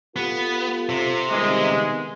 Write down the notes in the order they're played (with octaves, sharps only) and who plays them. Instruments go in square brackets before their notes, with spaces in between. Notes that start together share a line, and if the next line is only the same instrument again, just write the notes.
[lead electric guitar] B3 [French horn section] F4 G4 A4
[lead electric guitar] C3
[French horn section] D#3 G3 B3 [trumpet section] G#3